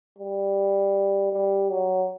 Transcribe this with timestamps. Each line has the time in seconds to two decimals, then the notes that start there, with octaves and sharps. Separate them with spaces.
0.18 G3
1.32 G3
1.71 F#3